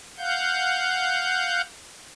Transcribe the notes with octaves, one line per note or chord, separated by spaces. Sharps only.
F5 F#5 G6